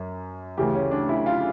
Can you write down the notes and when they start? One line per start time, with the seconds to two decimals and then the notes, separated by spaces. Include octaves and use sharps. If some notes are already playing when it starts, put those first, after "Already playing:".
Already playing: F#2
0.57 D2 C#3 E3 G4
0.75 C#4
0.91 D4
1.09 E4
1.26 F4